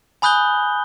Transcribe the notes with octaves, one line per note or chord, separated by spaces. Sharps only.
G#5 B5 D#6 F#6 G6 G7